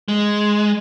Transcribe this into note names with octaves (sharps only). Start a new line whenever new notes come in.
G#3